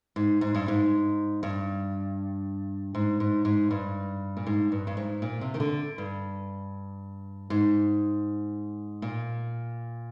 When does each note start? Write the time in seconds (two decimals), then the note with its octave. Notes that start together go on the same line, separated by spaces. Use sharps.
0.16 G#2
0.41 G#2
0.55 G2
0.68 G#2
1.43 G2
2.95 G#2
3.20 G#2
3.45 G#2
3.71 G2
4.37 A#2
4.46 G#2
4.72 G2
4.87 G2
4.97 G#2
5.22 A#2
5.41 C3
5.54 D#3
5.60 D3
5.98 G2
7.50 G#2
9.02 A#2